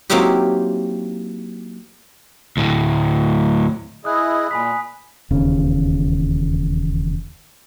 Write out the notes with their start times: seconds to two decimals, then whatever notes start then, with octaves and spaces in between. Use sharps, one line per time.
0.10 F#3 A#3 C4 D#4 E4 G4
2.57 D2 A2
4.05 E4 G#4 D#5 D#6 F#6
4.51 A#2 G#5 B5 B6
5.31 E1 D#2 C#3